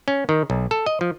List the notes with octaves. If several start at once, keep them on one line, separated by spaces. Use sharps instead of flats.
C#4
D#3
B1
A4
D#5
F3